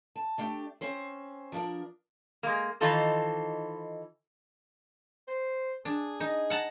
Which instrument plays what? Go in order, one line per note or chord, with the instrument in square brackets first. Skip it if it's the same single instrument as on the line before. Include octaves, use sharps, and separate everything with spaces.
[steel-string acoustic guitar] A5
A3 D4 G4
C4 C#4 C5
F3 D4 A#4
[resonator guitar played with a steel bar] G#3 A#3
D#3 E3 D#4 F4 A4 C5
[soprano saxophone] C5
[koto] D4 [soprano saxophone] G#4
[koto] D#4
F#5 A5 A#5